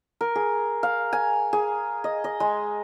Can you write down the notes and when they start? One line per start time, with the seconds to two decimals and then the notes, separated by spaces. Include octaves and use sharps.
0.21 A#4
0.35 G#4
0.83 F5
1.13 G#5
1.53 G#4
2.04 D#5
2.24 D#5
2.40 G#3